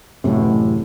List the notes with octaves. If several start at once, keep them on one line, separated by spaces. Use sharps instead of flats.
A1 F#2 A2 C3